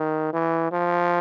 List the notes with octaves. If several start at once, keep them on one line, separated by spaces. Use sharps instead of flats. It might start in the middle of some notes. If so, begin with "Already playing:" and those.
Already playing: D#3
E3
F3